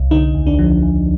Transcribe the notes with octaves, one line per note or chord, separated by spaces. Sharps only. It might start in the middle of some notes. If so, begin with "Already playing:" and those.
Already playing: C2
D3 D#4
D#2
D4
F3
D#2